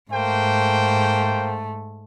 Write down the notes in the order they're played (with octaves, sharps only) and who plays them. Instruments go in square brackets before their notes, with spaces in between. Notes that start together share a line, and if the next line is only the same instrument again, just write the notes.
[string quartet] G#2 A3 [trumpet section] A#3 C5 G5